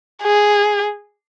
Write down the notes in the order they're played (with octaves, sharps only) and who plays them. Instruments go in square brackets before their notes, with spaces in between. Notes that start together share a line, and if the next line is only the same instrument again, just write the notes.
[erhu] G#4